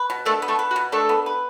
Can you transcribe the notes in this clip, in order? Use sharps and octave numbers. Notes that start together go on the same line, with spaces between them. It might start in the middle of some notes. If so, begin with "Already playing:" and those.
Already playing: B4
B2
A3 D4 A4
B3
A3 A4
B4
F#4
B2
A3 D4 A4
B3
B4